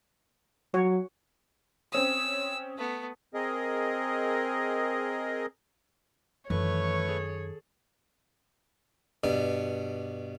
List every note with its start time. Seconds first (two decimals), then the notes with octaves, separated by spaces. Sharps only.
0.74 F#3 F#4 C#5
1.92 C4 C#4 D#6 E6
2.77 A3 B3
3.34 C4 G#4 A#4 D#5
6.50 F#2 D#3 E3 A3 B4 C#5 C#6
7.08 G#4 A4
9.24 G2 B2 D5